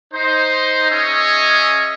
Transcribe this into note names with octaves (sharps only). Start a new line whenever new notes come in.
D#4 C5
C#4 G#4 C#5 D#5 E5